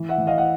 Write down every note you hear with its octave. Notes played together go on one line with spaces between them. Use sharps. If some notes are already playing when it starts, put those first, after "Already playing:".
Already playing: E3
E5 F#5
E3
D#5 F5
F#5